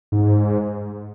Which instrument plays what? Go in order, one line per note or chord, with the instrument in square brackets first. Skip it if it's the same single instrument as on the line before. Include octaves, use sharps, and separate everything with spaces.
[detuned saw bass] G#2